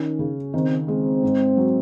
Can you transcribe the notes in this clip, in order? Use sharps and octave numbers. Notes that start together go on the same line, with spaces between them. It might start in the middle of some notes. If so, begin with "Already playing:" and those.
Already playing: D#3 C#4
C#3
D#3 C4
G#3 C4
G#2
F#3